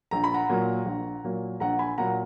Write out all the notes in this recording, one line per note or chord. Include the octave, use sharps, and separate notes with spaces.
A#1 A#5
B5
F#5 A#5
A#2 F#3 A#3
A#1
A#2 F#3 A#3
A#1 F#5 A#5
G#5 B5
A#2 F#3 A#3 F#5 A#5